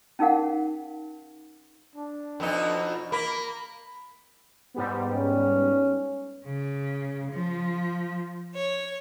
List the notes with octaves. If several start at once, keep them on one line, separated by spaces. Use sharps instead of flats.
C#4 D#4 G#4 A#4 F5 F#5
D4
F2 B2 D#4
A#3 B5
G#2 G3 B3
C#4
C#3
F3
C#5